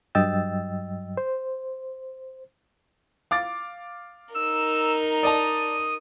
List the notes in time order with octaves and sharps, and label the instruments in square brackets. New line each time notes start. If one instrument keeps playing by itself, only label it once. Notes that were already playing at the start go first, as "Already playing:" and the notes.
[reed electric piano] G2 F#3 D#5 G5 E6 A6
C5
[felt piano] F5 D6 A6
[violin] D#4 A#4 [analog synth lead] E6
[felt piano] D5 D#5 A5 [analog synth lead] D#6